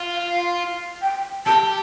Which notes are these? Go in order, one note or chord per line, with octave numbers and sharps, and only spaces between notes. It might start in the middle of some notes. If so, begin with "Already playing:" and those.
Already playing: F4
F5
G5
G4 A5